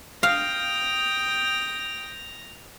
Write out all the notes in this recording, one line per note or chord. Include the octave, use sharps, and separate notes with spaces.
F5 G5 D#6 A#6 F7